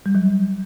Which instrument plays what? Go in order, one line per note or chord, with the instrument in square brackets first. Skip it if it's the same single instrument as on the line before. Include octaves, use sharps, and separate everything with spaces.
[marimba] G3
F#3